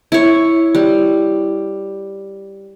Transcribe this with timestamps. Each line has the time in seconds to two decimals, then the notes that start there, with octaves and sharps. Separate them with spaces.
0.12 E4 C#5
0.75 G3